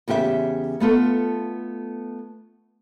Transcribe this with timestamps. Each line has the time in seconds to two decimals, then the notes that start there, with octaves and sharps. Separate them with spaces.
0.08 E2 C#3 G4 A#4 E5
0.80 A3 B3 F4 A4